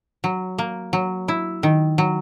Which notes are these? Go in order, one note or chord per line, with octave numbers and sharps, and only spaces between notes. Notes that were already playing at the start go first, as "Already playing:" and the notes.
F#3
A#3
F#3
E4
D#3
F#3